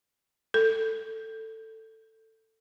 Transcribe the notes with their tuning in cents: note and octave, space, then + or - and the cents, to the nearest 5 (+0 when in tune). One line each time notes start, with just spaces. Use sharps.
A4 +15